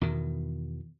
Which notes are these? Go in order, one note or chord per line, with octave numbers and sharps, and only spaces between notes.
E2 B2 D#3